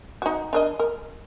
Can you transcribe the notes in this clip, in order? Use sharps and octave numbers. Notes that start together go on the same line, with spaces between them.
D#4 F#4
D4 A#4 D#5
A#4